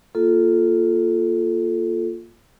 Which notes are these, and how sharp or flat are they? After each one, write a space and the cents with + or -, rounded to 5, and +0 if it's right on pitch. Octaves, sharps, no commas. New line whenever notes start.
A#3 +0 F4 +0 A4 -10